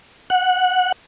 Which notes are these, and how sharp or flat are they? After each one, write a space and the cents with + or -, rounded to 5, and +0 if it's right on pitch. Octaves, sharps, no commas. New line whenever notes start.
F#5 -10